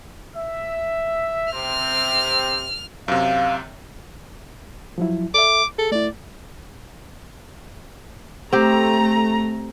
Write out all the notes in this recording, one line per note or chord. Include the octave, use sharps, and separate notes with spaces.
E5
C3 C4 F6
F#2 C3 F5
F3 F#3 E4
A4 E5 D6
G#4 A4
A3 E4 D5
A3 C4 G4 A#5